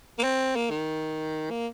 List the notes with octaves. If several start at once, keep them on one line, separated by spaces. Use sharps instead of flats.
A#3
C4
A#3
D#3
A#3